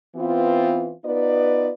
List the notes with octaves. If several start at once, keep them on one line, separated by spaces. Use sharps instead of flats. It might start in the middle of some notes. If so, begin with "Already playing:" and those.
E3 B3 C4 F4
B3 D#4 F4 B4 D5